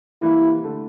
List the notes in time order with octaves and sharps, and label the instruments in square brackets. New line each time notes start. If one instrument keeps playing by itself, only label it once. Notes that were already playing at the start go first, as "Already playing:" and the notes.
[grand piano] C3 E3 G3 A#3 [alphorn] E4
[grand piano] D3 A3